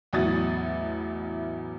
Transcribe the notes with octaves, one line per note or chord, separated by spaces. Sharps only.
A1 E2 F#3 E4 D#6 A6